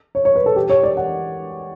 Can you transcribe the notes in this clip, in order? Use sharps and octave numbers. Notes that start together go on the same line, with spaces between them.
C#5
C#5
B4
A4
G4
C#5
D5
F#5